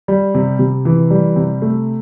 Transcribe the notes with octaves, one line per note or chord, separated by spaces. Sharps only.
G3
C3
C3
E3
G3
C3
A3